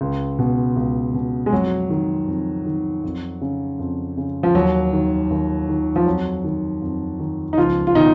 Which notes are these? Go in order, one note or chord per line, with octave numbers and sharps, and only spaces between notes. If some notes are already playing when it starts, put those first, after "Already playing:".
C#2
B2
C#2
B2
G#3
F2 F#3
D#3
F2
D#3
F2
C#3
F2
C#3
F3
D#2 F#3
D#3
D#2
D#3
F3
F2 F#3
D#3
F2
D#3
D#4
C#2 F3 F4
F4
B2 D#3 D#4